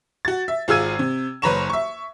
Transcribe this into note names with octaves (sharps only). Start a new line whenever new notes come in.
F#4 A6
E5
G#1 F4 G#4 E6 G#6 D#7
C3
F#1 B4 C#5 A#5 C#6 E7
E5 C#6